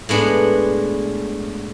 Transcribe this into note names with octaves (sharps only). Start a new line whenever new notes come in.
A2 G#3 B3 D4